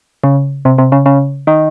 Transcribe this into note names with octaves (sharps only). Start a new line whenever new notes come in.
C#3
C3
C3
C#3
C#3
D#3